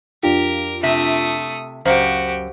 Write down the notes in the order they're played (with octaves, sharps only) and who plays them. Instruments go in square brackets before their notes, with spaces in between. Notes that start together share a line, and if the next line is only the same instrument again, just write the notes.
[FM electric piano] F2 D4 F4 [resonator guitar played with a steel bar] G4 [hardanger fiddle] A#4
[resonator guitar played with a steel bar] C3 E5 [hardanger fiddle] A3 D#6
[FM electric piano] C#2 [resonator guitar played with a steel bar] F#2 [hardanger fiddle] F#4 G4 [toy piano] C5 F5